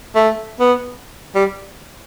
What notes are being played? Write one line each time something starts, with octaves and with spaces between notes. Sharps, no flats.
A3
B3
G3